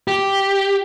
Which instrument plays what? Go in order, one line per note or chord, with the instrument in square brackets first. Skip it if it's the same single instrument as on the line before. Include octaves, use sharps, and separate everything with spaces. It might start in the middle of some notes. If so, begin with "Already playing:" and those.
[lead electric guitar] G4